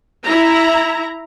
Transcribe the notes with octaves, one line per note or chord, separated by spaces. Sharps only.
E4 A#5